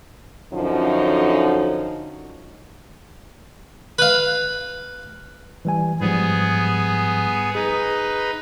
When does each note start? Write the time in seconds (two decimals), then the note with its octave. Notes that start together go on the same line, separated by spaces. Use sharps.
0.52 F#2 D3 F3 C#4 D#4
3.99 B4 F5
5.65 E3 G3 G#5
6.01 G#2 F3 G3 B3 G#4
7.55 D#4 G#4 B4